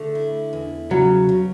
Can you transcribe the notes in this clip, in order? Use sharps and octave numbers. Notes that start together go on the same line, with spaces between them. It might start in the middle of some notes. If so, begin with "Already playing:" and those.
Already playing: D3 A3
E4
E2
C#3 F#3
C#3